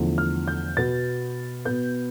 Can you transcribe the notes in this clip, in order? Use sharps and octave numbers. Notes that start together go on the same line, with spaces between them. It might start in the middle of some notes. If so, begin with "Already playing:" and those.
Already playing: E2 D3 F3 A3
F6
G6
B2 B3 A6
B2 B3 G6